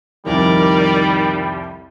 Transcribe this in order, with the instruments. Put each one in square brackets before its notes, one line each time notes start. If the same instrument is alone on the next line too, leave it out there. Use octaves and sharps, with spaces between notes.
[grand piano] C2 F2 [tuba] D#3 [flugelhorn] G3 [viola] A#4 D5